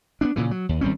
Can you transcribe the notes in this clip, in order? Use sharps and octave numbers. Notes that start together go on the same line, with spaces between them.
B3 C4 D4
A#2 C#3 E3
F#3
D#2
G#1 G3 C4 C#4